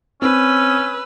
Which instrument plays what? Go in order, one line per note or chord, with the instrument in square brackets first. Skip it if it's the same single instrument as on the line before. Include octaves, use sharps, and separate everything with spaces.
[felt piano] C4 [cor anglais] C#4 [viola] B4 [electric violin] E6